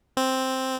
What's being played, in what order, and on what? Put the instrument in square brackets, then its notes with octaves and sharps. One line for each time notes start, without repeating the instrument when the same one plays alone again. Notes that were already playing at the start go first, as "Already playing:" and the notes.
[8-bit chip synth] C4